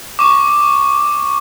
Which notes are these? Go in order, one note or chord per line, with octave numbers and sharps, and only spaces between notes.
C#6 D6